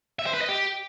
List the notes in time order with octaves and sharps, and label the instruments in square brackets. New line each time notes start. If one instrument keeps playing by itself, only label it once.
[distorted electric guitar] E5
C5
B4
D#5
G4